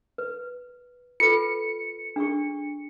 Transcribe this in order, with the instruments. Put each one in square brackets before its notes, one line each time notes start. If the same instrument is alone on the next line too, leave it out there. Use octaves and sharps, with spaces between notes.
[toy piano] B4
[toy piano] F4 A4 B4 [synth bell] C#7
[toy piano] D4 G#4 C#6